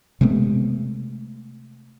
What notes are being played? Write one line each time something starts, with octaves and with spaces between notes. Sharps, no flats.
C3 G#3 A3 B3